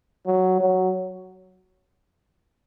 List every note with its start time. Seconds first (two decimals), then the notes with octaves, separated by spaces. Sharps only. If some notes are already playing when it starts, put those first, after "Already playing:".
0.26 F#3
0.60 F#3